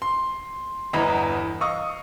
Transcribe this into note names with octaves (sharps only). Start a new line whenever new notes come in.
C6
G1 E2 E3 D#5 A#5 B5
D#5 F5 C#6 D#6